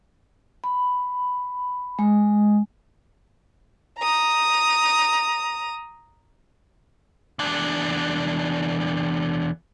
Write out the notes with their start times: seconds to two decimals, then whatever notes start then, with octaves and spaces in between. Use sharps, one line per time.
0.64 B5
1.99 G#3
3.99 A#5 D#6
7.39 E2 D4